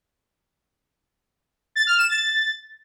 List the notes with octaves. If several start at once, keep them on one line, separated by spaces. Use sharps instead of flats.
A6
F6
E7
A6